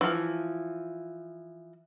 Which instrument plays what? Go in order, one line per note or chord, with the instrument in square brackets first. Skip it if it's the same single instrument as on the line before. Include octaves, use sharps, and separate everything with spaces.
[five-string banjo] E3 F3